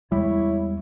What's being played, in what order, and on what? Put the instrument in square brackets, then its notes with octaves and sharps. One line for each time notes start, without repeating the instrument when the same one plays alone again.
[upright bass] E2 G#3 [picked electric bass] G3 [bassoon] E4 [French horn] C#5